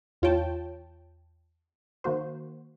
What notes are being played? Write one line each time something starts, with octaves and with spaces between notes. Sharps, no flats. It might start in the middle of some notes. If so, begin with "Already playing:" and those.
E2 F4 C#5 G5 A5
D#3 A#3 F#4 C5